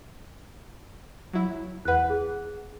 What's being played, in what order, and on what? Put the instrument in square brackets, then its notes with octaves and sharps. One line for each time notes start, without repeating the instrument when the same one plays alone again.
[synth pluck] F#3 E4
[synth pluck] E2 B4 [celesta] F#5 F#6
[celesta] G#4